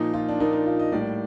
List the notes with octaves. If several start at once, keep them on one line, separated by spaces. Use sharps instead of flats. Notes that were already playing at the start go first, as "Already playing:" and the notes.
Already playing: A#2 F3 A#3 D#4
F4
D4
A#2 F3 A#3 D#4
D#4
F4
D#5
A2 G3 A#3 D5